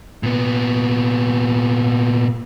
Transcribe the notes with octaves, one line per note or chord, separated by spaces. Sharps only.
A#2 B3